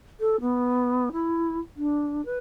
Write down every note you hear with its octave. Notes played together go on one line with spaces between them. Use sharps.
A4
B3
E4
D4
B4